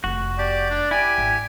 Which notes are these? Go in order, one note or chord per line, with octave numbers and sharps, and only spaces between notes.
F1 F2 F#4
G4 D5
D4
E4 G4 G#5
G#1